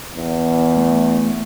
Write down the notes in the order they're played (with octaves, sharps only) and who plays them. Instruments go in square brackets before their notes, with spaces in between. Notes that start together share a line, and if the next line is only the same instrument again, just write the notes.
[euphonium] E2
[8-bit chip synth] A3